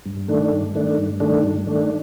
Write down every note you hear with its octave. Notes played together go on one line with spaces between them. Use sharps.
G2
D#3 A3 D4
G2
D#3 A3 D4
G2
D#3 A3 D4
G2
D#3 A3 D4